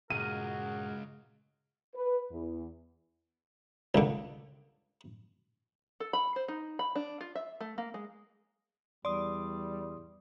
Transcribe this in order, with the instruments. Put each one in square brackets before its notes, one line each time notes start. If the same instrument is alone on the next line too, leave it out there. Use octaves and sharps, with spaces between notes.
[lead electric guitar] C#2 [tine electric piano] G2 A#2 [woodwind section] F#4 G#4 A#4 [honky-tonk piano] D#7
[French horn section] B4
E2
[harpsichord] C#2 D3
[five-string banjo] A4
B5
C5
D#4
B5
D4
F4
E5
A3
A#3
G#3
[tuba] E2 [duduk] G3 [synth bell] D5 [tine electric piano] C6 D#6